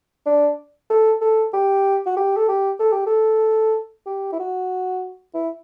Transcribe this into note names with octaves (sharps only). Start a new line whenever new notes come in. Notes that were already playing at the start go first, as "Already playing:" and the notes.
D4
A4
A4
G4
F#4
G4
A4
G4
A4
G4
A4
G4
E4
F#4
E4